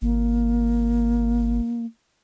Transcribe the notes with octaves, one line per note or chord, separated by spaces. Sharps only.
G#1 A#3